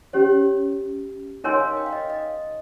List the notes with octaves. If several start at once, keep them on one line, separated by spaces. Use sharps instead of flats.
C#4 G4 C5 C#5
D#4 A#4 C#5 D#5 G#5 C6
F5
G5
F5
D#5
D#5